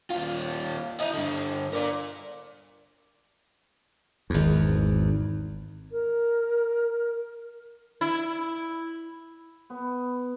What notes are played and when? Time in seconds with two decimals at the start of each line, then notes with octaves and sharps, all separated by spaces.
0.11 D#2 F4
1.00 E4 D#5
1.13 G2 D3
1.73 A#4 D5
4.30 G#1 E2
5.92 A#4
8.01 E4
9.70 B3